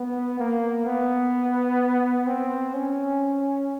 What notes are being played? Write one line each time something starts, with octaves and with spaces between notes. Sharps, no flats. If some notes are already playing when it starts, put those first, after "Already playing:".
Already playing: B3
A#3
B3
C4
C#4